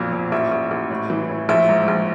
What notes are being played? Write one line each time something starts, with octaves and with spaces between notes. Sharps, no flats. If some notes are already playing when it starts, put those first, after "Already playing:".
Already playing: B1 F2 A#2
A#2
A1 E5
A1
A1
A2
E3
A2
A#1 E5
G#2
A#1